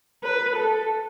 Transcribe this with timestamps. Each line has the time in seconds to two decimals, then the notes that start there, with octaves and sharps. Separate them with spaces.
0.24 B4
0.56 A4